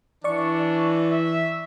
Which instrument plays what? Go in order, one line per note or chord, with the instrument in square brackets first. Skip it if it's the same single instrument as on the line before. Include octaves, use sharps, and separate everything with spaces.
[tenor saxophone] E3 [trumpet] D4 [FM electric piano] D5 C#6
[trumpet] E5